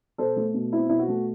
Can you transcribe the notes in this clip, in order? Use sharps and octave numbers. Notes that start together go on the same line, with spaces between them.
B2 A4 C5
A3
B2
C4 E4
B2 E4
F#4
A3